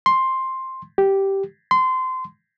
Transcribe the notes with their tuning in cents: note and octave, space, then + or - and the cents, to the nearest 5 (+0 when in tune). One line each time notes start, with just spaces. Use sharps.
C6 +10
G4 -5
C6 -20